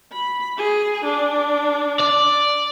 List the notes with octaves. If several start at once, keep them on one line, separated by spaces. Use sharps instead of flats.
B5
G#4
D4
D5